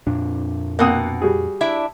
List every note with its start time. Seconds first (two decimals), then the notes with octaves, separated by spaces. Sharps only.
0.07 F2 A#2 D4
0.79 B2 A#3 C4 F#5 D#6
1.22 G3 F#4 G#4
1.61 D4 E4 E5